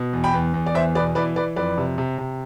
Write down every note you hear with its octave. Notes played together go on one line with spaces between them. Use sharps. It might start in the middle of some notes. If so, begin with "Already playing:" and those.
Already playing: B2
E2
G5 B5
E2
E2
D5
E2 C5 E5
B2 B4 D5
E3 B4 D5
E3 B4 D5
F2 B4 D5
C3
C3
C3